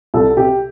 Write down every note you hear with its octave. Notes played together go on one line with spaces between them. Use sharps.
C2 A4
C3 G4